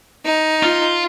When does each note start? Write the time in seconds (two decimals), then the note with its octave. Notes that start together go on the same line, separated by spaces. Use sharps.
0.25 D#4
0.63 F4